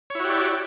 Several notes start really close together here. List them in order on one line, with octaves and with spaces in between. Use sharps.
C#5 E4 F#4 G4 D5